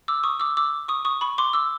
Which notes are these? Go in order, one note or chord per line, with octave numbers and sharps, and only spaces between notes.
D6 E6
C#6 D#6
D6 E6
D6 E6
C#6 D#6
C#6 D#6
B5 C#6
C6 D6
D6 E6